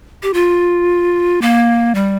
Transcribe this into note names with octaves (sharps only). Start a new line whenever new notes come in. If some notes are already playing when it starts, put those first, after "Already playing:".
G4
F4
A#3
G3